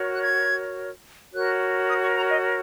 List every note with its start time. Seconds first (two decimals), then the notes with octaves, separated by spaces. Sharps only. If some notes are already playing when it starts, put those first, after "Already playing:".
Already playing: F#4 A#4 C#5
0.13 F#6
0.23 G#6
1.33 F#4 A#4 C#5 F#6
1.89 D#6
2.02 C#6
2.17 A#5
2.30 D#5